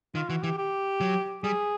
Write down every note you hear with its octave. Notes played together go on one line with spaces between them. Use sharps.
D#3 F4
E3 F#4
E3 G4
G4
F#3
G3 G#4